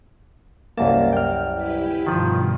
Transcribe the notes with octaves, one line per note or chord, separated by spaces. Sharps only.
C2 F#2 A#3 A5
G5 F6
E4 G4 B4
G2 B2 D#3 F3